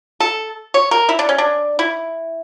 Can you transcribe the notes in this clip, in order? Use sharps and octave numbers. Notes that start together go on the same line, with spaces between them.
A4
C#5
A#4
E4
D4
C#4
D4
E4